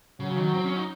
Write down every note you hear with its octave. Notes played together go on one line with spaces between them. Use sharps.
C#3 F#3
D#3
C4
C#4
D#4